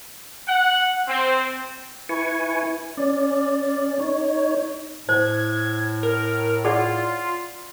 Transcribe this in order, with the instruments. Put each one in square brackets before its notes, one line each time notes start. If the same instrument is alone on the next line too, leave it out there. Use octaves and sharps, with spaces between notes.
[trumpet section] F#5
C4
[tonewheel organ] E4 B4 G#5 C#6
C#4 D5
D#4 C#5
[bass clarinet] A2 [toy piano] C5 [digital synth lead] G#6
[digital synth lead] A#4
[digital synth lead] F4 [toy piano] G#4 D5 F#5